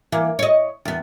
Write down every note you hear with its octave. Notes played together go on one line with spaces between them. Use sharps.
E3 A#3
C#5 D#5
E2 B3